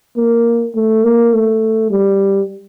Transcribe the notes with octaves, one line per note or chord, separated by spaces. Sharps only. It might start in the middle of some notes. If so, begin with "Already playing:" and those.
A#3
A3
A#3
A3
G3